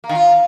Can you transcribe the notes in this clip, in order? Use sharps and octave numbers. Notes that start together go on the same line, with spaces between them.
A#3
D#3
F4